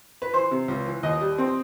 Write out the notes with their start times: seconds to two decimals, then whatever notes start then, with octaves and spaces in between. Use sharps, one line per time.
0.22 B4
0.33 E3 C5
0.51 C3
0.68 C#2
0.86 E3
1.03 D#2 D#5
1.21 G3
1.38 C4